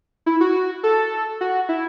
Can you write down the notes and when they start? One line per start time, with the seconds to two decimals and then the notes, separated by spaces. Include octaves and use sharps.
0.26 E4
0.41 F#4
0.83 A4
1.41 F#4
1.69 E4